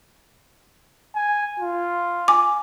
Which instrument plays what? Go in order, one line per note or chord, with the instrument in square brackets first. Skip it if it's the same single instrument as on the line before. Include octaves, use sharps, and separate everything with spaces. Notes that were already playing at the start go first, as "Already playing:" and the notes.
[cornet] G#5
F4
[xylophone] G#5 D6